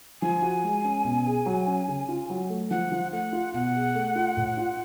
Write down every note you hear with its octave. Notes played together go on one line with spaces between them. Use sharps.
F3 G#5
F#4
G#3
C#4
B2
G#4
F#3
C#4
C#3
F4
F#3
A3
F3 F#5
F3
A3 F#5
F4
B2 F#5
G#4
A3
F4
A2
F4